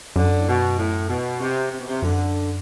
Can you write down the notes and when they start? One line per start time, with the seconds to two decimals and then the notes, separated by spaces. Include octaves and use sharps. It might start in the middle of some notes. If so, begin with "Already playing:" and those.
0.16 F#2 D3
0.39 A2
0.48 B2
0.78 A2
1.09 B2
1.40 C3
1.71 C3
1.79 B2
1.87 C3
2.02 F#2 D3